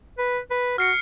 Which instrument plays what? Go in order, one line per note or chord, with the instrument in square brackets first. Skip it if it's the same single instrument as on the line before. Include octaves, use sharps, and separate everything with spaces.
[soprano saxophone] B4
B4
[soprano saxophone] F#4 [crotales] F6 C7 C#7